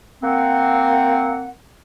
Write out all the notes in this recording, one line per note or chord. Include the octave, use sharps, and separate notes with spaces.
A#3 C4 F#5